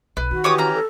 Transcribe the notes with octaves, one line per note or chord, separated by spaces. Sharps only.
B1 B4
D#3 F#4
E3 G4 C#5 D6 D#6
C#4 A#5
A4